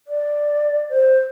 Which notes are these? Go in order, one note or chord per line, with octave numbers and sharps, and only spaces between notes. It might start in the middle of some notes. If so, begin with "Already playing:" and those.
D5
C5